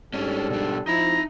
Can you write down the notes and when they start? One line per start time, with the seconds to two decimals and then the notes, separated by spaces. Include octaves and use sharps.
0.14 G#2 G3 C#4 D4 A4
0.50 B2 D4
0.87 F3 D#4 E4 A#5 B5